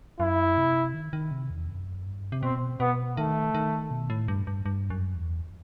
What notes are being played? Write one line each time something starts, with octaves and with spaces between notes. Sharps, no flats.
F#2 E4
C3
D#3
D#3
C3
E2
F#2
G2
C3
B2 C4
B2 B3
D#3 A3
D#3
B2
A2
G2
G2
G2
F#2
E2